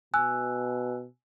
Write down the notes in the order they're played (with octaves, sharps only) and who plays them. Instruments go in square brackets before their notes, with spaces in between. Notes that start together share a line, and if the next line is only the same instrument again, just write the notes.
[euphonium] B2 [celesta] G#5 E6 F#6